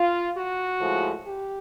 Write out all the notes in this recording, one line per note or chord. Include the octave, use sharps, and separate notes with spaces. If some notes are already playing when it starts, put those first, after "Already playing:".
Already playing: F4
F#4
A2 F3 G#3
G4